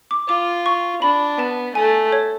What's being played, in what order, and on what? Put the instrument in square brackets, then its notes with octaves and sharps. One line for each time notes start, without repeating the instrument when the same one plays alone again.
[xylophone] D6
[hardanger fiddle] F4 [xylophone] D6
[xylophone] C#6
[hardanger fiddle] D4 [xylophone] B5
[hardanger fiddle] B3 [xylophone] A5
[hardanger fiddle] A3 [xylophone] G#5
[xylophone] C#5